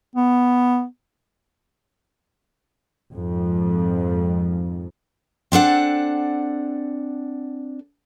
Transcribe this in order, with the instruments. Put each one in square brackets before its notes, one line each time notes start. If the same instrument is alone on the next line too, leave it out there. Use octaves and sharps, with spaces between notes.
[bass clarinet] B3
[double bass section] F2 G#2
[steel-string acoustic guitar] C4 D4 A4 F#5